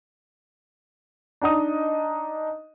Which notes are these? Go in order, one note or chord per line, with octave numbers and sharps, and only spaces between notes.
D4 D#4 D#5 D#6